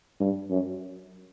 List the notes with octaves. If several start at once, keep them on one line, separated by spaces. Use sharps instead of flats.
G2
F#2